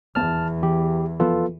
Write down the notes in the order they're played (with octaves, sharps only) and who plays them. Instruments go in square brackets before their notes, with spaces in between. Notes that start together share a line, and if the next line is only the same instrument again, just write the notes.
[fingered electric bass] D#1 B3 [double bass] E2 [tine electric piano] A5 F6
[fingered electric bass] E3 [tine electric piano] G4
[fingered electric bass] F1 F3 B3 [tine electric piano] F4 A4 B4